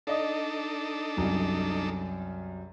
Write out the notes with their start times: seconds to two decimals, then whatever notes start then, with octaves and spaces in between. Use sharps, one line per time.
0.07 D4 D#4 A4 D5 D#5 D#6
1.17 C2 F#2